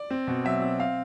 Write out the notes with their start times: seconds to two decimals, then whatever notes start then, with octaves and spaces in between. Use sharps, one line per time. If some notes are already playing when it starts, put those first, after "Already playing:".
Already playing: D5
0.11 C4
0.28 B2
0.45 F#3 E5
0.62 C4
0.79 C4 F5